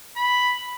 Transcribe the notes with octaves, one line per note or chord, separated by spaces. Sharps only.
B5